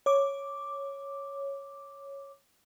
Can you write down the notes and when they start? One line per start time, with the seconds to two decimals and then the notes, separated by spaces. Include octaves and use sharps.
0.06 C#5 D6